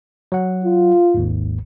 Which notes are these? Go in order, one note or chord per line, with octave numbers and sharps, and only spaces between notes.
F#3 F#5
F4
G#1 D#2 G#2